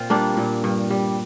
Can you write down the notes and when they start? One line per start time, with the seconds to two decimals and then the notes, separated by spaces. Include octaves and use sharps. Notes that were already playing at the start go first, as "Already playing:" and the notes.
Already playing: A#2 C4 F4
0.10 G3 A#3 D4
0.37 A#2
0.64 G2
0.90 G3